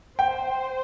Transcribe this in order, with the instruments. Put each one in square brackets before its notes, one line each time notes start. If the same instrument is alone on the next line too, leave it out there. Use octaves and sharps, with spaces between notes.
[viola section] C5 [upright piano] G5